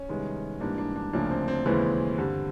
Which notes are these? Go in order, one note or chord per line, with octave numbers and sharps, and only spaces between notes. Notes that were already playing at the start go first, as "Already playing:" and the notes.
Already playing: C#4
C2 C3 D#3 G#3 B3
G#2 E3 G3 A#3 D4
D4
D4
D2 C#3 F3 A#3 D4
C4
C4
D#2 C#3 E3 G#3 B3 C4
G2 D3 G3